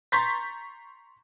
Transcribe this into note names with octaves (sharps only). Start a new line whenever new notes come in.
A#5 C6 C#6 G6 A6 B6